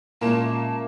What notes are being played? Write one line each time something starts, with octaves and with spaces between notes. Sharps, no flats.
A#2 G#3 A#3 C#4 F4 E5 A5 E7